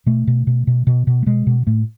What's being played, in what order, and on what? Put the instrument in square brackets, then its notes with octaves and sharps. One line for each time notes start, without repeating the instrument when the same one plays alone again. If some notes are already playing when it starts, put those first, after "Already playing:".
[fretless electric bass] B2 A3
B2
B2
B2
B2
B2
A3
B2 G#3
B2
A2 A3